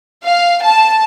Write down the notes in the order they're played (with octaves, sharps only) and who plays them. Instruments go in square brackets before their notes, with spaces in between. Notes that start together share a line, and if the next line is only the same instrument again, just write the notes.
[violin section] F5
A5